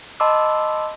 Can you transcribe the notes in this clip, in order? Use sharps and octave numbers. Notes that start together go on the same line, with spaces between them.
D#5 A5 B5 C6 D6 E6